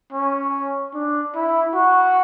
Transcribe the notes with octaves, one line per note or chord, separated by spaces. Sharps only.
C#4
D4
E4
F#4